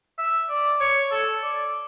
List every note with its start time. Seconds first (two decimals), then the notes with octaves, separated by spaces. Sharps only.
0.18 E5
0.49 D5
0.80 C#5
1.11 A4
1.43 D5